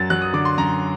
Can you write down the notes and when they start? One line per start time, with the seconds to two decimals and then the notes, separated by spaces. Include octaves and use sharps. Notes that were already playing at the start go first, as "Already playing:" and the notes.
Already playing: F#2 F#3 A6
0.10 F#3 F#6
0.22 D#6
0.33 D3 D6
0.45 C6
0.58 F#2 A#5